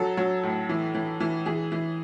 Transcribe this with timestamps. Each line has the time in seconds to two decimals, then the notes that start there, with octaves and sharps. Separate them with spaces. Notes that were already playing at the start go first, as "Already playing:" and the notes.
Already playing: F#3 A4
0.17 F#3
0.43 A2
0.69 E3
0.95 E3
1.20 E3
1.46 E3 G#4
1.72 E3